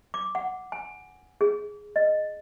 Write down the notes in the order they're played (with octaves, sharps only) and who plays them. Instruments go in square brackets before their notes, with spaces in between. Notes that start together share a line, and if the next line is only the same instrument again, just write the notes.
[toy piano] D6
F#5
G#5
G#4
D#5